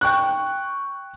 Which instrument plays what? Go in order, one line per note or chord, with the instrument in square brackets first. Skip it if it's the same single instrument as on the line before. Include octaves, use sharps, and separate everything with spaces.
[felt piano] G5 C#6 F#6